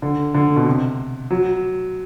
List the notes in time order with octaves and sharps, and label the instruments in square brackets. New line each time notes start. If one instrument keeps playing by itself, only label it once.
[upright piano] D3
D3
B2
C3
F#3